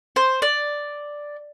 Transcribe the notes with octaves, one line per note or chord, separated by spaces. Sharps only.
C5
D5